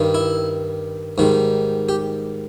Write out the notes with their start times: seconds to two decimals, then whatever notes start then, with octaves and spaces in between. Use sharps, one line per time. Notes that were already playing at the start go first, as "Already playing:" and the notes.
Already playing: G2 D#3 G3
0.14 E4
1.18 G#2 D#3 G3
1.89 G4